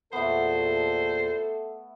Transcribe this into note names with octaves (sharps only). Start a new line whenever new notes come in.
E2 A#2 A3 B3 A4 C5